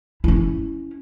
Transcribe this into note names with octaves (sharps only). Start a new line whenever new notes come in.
C#4 E4